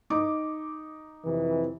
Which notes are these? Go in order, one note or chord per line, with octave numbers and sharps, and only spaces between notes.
D#4 D6
F2 C3 E3